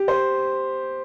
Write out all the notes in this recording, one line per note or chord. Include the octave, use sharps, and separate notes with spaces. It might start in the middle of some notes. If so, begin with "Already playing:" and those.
Already playing: G4
C5